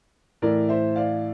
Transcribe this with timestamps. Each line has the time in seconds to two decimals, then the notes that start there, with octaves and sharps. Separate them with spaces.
0.42 A2 E3 A#4 D5
0.69 C5 E5
0.96 D5 F5